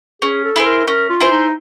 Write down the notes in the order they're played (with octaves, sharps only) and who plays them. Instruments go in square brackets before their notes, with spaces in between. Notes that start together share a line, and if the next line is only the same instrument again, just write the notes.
[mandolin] C#4 [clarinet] G#4
[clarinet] A4
[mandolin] E4 G#4 C5
[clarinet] A#4
[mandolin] C#4 [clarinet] A#4
[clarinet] F4
[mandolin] E4 G#4 C5
[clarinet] D#4